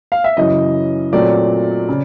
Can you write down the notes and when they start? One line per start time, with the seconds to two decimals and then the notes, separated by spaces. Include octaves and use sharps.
0.12 F5
0.24 E5
0.37 F#2 C#3 E3 D#5
1.13 A#2 F#3 A3 C4 D5
1.89 C#3